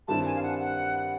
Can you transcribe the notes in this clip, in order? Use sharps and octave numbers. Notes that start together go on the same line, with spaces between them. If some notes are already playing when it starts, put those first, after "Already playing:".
G2 D#3 G3 C4 E4 A5
G#5
F5
F#5
F#5